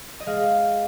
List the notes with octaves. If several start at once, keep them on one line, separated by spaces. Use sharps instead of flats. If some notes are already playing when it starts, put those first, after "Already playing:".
D#5
G#3 F5